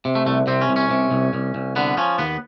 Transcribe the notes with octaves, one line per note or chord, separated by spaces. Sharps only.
C3
A3
C2 A3
C3 C4
C#4
C2
C#4
C3
C2
C2
C2
D3 B3
F3 C#4
D#2 B3